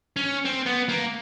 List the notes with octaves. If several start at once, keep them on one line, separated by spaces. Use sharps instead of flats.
C#4
C4
B3
A#3